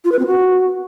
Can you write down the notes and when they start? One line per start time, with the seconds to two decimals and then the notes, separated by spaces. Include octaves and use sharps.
0.05 F4
0.12 B4
0.19 C4
0.26 F#4